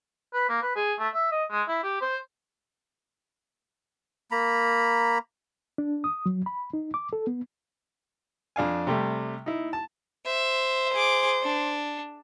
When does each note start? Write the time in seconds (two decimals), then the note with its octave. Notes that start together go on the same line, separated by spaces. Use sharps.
0.34 B4
0.49 A#3
0.62 B4
0.76 G#4
0.99 A3
1.14 E5
1.32 D#5
1.51 G#3
1.68 E4
1.83 G4
2.01 C5
4.31 A#3 A#5 B5
5.78 D4
6.04 D#6
6.26 F#3
6.46 B5
6.73 D#4
6.94 D6
7.13 A4
7.27 B3
8.56 F2 D4 F5 G#5
8.87 C3 G3 A3
9.46 D#4 E4
9.73 A5
10.26 C5 E5
10.93 G#4 D6
11.42 D4